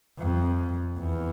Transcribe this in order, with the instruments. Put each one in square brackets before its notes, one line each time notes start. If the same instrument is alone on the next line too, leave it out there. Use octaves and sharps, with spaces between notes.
[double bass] F2
E2